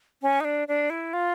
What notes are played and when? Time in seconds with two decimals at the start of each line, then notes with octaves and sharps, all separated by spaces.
0.22 C#4
0.40 D#4
0.45 D4
0.68 D4
0.90 E4
1.13 F4